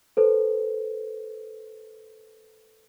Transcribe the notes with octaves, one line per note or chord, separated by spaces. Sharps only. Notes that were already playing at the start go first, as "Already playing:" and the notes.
A4 B4 C5